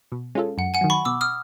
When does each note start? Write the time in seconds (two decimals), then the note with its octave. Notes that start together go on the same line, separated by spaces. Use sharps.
0.12 B2
0.35 G#3 C#4 F4 A4
0.58 F#2 F#5
0.74 F#5 G#5
0.81 D#3 F#3
0.90 B5 C#6
1.05 B2 D6 E6
1.21 D#6 F6